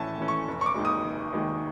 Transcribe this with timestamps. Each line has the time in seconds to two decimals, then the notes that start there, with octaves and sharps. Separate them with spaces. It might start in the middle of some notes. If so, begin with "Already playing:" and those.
Already playing: A2 E3 A3 C#4 G#5 A5
0.18 E3 A3 C#4
0.28 C#6
0.48 F1
0.61 C#6
0.66 D6
0.75 D#2 D#3 G#3
0.85 D#6
1.05 F1
1.32 D#2 D#3 G#3